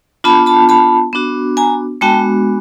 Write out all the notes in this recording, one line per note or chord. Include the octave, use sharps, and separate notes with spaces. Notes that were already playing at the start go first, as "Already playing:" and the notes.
B3 D4 F4 A5 B5
A5 B5
A5 B5
B3 D4 F#4
G#5 A#5
G#3 B3 D4 F#4 G5 A5